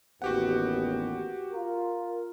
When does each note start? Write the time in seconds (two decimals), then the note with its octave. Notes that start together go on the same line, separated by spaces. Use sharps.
0.22 A1 D#2 B3 F#4 G4 F#5
1.52 F4 A#4